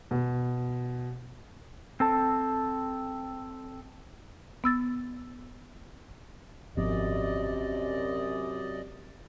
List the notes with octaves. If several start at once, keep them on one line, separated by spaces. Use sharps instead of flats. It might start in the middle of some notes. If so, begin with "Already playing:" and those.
B2
C4 A4 A5
B3 E6 A6
G#1 F#2 C3 F3 B3 D5 D#5